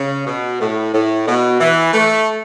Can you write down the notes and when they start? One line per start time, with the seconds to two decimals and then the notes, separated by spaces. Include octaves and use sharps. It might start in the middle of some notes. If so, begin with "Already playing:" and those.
Already playing: C#3
0.26 B2
0.60 A2
0.93 A2
1.27 B2
1.60 E3
1.93 A3